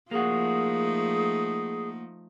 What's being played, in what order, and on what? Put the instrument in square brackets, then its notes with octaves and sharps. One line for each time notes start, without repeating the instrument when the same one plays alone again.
[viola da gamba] F3 A3 D#4 [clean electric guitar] A#3 F#4 [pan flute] G#4